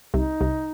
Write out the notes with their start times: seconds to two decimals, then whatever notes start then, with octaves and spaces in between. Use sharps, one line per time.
0.14 C2 C3 D#4
0.41 C2 C3